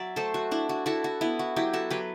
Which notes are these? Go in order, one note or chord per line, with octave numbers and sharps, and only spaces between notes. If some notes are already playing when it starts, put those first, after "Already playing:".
Already playing: F#3 F#4 D5 E5
A3 A4 C5
F#4
D4 E4
F#4
E4 F#4 A4
F#4
B3 E4
F#4
F#3 E4 G4
F#4 A4
F#3 G4 B4